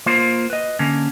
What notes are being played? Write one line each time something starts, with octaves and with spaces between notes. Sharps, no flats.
A#3 F4 C5
B4 D#5
D3 A#3 C#4